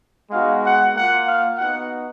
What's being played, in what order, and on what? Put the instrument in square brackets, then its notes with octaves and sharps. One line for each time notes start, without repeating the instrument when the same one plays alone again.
[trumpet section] G#3 B3 D#4 F#4 F5
F#5
A#3 F4 F#5
F5
B3 D#4 F#4 F#5